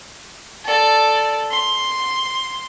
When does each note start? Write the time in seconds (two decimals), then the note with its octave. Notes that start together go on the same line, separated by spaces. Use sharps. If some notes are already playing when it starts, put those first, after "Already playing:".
0.64 A4 D5
1.50 C6